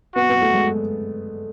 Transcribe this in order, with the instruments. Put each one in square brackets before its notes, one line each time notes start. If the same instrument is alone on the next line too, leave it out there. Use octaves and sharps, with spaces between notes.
[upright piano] B3 [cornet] F#4
[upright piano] B3
A3
G#3